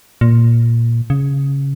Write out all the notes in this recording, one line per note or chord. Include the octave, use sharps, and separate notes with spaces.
A#2
C#3